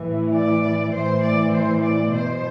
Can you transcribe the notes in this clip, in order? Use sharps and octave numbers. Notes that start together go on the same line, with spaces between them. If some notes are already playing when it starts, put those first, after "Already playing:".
Already playing: A2 E3
D5
A2 E3 C5
D5
C5
D5
B2 C5